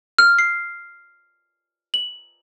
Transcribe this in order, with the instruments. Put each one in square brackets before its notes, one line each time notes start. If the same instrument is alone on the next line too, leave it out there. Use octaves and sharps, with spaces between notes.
[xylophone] F6
C7
F#7